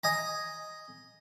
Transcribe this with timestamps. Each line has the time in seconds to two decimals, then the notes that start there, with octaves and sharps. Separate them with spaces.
0.04 D#5 G#5 A#5